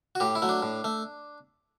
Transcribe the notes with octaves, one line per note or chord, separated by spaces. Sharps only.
F#4
A2 G4
E4
F#3 A3
D4
A2
A3